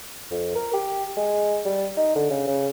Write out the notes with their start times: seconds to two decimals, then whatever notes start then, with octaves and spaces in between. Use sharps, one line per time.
0.31 F2
0.55 A#4
0.73 G4
1.17 G#3
1.65 G3
1.97 D#4
2.15 D3
2.30 C#3
2.47 C#3